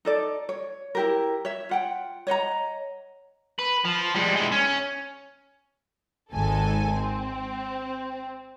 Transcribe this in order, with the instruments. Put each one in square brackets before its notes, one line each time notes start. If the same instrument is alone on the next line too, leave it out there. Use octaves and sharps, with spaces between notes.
[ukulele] D#4 A4 D5
C#5
E4 G4 A#4
C#5 E5
F4 F#5 G5
C#5 D#5 F#5 A#5
[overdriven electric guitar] B4
F3
G3 G#3
G#3 E4
C#4
[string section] G#1 G#2 A4 G#5
C4